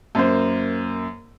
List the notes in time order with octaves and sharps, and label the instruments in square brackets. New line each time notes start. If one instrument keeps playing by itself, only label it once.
[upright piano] F#2 A#3 C5